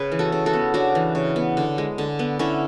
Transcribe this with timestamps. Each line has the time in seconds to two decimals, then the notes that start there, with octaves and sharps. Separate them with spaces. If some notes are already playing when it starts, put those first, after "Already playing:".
Already playing: C#3 G#4 B4
0.12 E3
0.19 F#4 A4
0.32 C#3
0.46 F#4 A4
0.53 B3
0.74 C#3 D4 F#4
0.95 E3
1.15 C#3
1.36 B3
1.57 D3
1.78 G#3
1.98 D3
2.19 B3
2.39 D3 C#4 E4